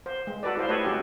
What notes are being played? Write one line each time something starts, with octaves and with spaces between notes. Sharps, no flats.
C5
G#3
F#4 A4 B4 D5
E4 C5 F5
A3 G4 A4 B4 C#5 D#5
G#3 C#4 F#4 G4 A4